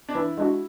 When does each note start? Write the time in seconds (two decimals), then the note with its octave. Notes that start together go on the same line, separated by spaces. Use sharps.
0.09 D4
0.15 E3 E4
0.38 G#3 D4 F#4